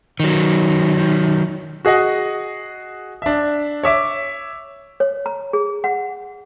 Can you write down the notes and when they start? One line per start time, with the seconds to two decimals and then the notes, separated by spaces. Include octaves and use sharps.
0.20 D#3 F#3
1.85 F#4 G#4 D#5 F#5
3.22 D4 E5
3.83 C#5 E5 D6
5.00 C#5
5.26 A#5
5.53 G#4
5.84 F#5